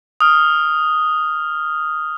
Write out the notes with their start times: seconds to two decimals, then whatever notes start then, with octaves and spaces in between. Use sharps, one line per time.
0.21 D#6 F6